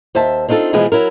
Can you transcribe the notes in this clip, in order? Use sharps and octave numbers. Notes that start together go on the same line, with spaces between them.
D#2 C5 E5 A5
C4 D4 D#4 F4 A4
B2 E3 F3 G#3 B3 G#4
F#3 E4 A#4